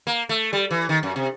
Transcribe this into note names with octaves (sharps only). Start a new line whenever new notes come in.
A#3
A3
G3
E3
D#3
F#2
C3